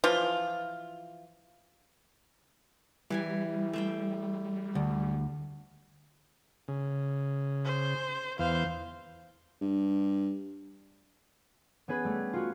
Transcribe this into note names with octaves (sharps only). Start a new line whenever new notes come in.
E3 F3 F4
E3 G3 G4 G#5
A3 C5 G5
D2
C#3
C5
E2 E3 C5 F5
G2
B3 C#4 G#4 B4
G3 A3
F4 F#4